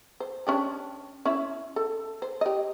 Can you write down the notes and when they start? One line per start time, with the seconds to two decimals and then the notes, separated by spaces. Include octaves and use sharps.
0.20 C5
0.47 C#4 D4 G4
1.25 C#4 E4 E5
1.76 A4
2.22 C5
2.41 G4 D#5